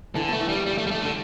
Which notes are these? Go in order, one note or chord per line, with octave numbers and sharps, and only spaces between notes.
D3 E3
B2 A3
E3
G2 G3
G3
A3
G3
A3
D3